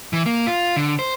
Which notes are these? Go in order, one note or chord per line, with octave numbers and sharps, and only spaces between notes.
E3
A#3
F4
D3
C5